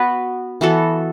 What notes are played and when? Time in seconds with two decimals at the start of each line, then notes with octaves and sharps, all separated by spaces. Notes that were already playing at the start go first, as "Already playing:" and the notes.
Already playing: B3 F#4 B4
0.61 E3 B3 F#4 A4